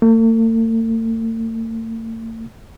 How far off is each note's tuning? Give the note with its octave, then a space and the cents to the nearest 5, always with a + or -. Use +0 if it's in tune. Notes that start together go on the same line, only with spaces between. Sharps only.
A3 +45